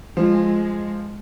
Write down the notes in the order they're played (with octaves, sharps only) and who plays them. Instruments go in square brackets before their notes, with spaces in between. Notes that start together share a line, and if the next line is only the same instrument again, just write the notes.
[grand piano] F3 [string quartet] G#3